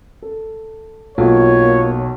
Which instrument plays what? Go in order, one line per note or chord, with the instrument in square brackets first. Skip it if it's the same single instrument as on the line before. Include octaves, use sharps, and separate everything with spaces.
[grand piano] A4
[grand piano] B1 [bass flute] A#3 [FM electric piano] F4 [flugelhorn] C#5